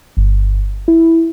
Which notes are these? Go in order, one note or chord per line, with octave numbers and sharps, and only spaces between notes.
G1
E4